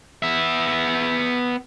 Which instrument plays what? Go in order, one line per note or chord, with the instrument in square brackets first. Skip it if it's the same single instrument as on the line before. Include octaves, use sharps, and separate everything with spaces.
[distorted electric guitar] B3 E5